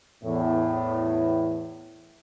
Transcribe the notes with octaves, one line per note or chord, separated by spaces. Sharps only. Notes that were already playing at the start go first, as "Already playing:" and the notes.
E2 A2